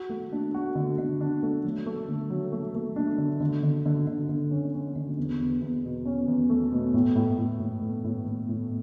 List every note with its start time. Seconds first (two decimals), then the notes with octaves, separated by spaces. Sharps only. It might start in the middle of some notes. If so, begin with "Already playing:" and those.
Already playing: F#4
0.09 A3
0.32 D4
0.54 F#4
0.75 D3
0.98 D3
1.21 D4
1.43 A3
1.64 F#3
1.86 A3
2.08 D3
2.30 F#3
2.52 A3
2.75 A3
2.96 D4
3.18 D3
3.40 D3
3.63 D3
3.86 D3
4.07 D3
4.29 D3
4.51 C#4
4.73 C#4
4.96 D3
5.18 E2
5.40 E2
5.61 E2
5.84 B2
6.06 C#4
6.28 E2
6.49 A3
6.72 B2
6.94 A2
7.16 A2
7.38 A2
7.60 A2
7.82 A2
8.04 A2
8.26 A2
8.49 A2